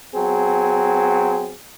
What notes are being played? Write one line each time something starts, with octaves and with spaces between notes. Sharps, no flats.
F#3 B3 C4 G#4